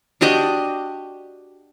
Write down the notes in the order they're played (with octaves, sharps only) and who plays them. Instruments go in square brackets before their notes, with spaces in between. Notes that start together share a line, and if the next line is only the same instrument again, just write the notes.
[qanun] D4 F#4 G4 D#5